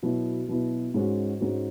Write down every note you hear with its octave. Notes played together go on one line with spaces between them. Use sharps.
B2 F#3 B3 E4
B2 F#3 B3 E4
G#2 G#3 C#4 F#4
G#2 G#3 C#4 F#4